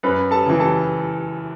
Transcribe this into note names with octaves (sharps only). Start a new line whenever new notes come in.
F#2 B4 B5
A4 A5
C#3 E3
A4 A5